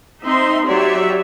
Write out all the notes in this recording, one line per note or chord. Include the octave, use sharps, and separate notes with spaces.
C4 D#4 E5 C6
F#3 G4 C#5 D5 E5